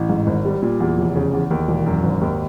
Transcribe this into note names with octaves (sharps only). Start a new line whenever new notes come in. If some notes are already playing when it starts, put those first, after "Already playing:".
Already playing: A1
G#2
G#1
G3
A#2
E2
F1
C#3
E2
D#2
E1
F#2
G#1
D#2